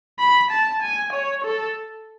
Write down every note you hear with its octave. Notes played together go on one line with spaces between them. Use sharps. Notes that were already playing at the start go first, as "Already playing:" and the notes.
B5
A5
G#5
C#5
A4